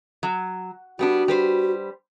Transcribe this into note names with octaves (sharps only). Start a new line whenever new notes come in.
F#3
G3 B3 D4 F#4
G3 B4 C5